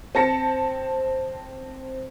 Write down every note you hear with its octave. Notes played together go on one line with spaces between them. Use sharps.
C4 A5 A#6 C#7